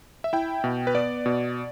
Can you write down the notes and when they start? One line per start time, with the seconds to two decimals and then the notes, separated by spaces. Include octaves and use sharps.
0.24 E5
0.33 E4 G5
0.64 B2
0.87 B4
0.95 B3 D5
1.26 B2